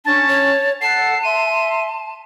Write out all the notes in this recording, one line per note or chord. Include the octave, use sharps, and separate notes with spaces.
C#4 D4 A5
C#5
A4 F#5 A5 C7
E5 C6 D#7